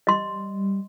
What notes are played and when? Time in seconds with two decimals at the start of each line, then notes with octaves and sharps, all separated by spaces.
0.07 G3 D#5 C6